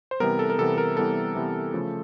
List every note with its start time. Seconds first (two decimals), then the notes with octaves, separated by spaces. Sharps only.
0.11 C5
0.20 C3 E3 G3 B3 A#4
0.39 A4
0.50 A#4
0.58 C3 E3 G3 B3 A4
0.78 A#4
0.97 C3 E3 G3 B3 A4
1.35 C3 E3 G3 B3
1.74 C#3 F3 A3